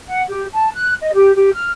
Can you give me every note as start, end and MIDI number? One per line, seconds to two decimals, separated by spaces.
0.07 0.22 78
0.29 0.44 67
0.53 0.69 81
0.74 0.93 90
1.01 1.13 75
1.13 1.33 67
1.35 1.50 67
1.53 1.68 89